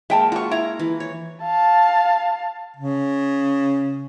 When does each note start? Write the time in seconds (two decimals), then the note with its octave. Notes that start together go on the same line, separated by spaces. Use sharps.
0.10 G#3 A#3 E5 G5 A5
0.32 F4 F#4 C#6
0.51 E4 A#5
0.79 E3
1.00 C#5
1.43 F5 A5
2.76 C#3